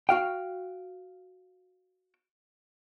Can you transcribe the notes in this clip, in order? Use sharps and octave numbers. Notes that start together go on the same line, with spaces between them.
F#4 F5 G5